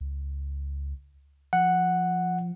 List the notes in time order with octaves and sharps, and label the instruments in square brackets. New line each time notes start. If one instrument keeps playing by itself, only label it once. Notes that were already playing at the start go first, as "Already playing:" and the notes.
[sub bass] C#2
[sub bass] F3 [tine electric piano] F#5